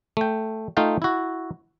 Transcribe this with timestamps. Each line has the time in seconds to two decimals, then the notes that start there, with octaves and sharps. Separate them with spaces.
0.17 A3 G5
0.77 A3 D#4 F4 F5 G5
1.02 E4 F#4